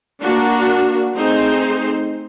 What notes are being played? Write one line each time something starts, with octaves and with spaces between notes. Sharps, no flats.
A#3 D4 F#4
A3 C4 D#4 G#4 C5